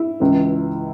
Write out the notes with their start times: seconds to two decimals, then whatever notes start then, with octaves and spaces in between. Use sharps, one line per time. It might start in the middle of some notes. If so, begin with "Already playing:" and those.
Already playing: E4
0.20 C#2 C#3 E3